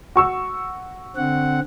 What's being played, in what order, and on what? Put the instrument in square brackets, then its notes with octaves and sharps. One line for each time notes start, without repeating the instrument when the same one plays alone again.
[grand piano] F#4 C#6 E6
[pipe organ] D3 C4 F#5